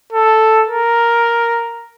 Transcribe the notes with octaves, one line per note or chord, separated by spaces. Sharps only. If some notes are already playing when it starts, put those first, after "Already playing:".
A4
A#4